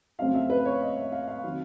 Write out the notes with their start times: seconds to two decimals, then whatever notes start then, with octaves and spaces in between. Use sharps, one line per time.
0.19 F2 C#3 F#3 A3 C4 F5
0.34 E5
0.50 B4
0.65 C#5
0.81 D#5
0.96 E5
1.12 F5
1.28 F5
1.43 C3 D#3 F#3